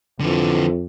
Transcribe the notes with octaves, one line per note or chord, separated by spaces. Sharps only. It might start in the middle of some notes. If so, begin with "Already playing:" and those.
F2 D3 E3